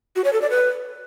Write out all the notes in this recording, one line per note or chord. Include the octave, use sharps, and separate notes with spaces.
F#4
C#5
A4
D5
B4